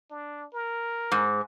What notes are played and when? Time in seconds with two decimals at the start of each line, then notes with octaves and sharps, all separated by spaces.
0.11 D4
0.54 A#4
1.12 G#2